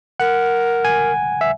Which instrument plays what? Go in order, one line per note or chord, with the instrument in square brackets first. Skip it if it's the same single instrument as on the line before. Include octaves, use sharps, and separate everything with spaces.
[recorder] A#4 [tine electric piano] F#5
[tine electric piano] G#5
E5